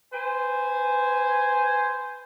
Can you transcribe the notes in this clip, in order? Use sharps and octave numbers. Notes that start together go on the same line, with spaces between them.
B4 C5 G#5